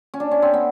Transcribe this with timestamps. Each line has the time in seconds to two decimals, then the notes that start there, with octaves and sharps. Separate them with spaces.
0.14 C#4
0.20 D4
0.31 C#4
0.42 C4
0.54 B3